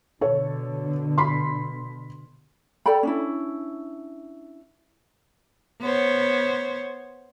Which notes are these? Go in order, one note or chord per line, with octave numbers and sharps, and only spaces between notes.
B2 D3 A4 C#5
B5 C6
A4 D5 G5 B5
C#4 D4 E4
B3 C5 C#5